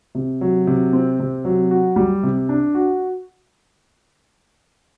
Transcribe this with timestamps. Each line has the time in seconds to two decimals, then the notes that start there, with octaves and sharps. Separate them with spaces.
0.15 C3
0.41 F#3
0.67 C3
0.93 C4
1.20 C3
1.45 F#3
1.71 F#4
1.96 G3
2.23 C3
2.49 D4
2.75 F#4